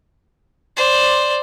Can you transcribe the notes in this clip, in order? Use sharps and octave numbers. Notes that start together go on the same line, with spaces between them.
C5 D5